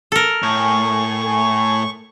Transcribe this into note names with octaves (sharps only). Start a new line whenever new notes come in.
A4 A#4
A2 G#5 C#6